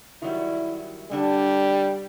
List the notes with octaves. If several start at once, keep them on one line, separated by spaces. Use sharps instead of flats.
D#3 F#3 G3 E4
D3 G3 D4 A5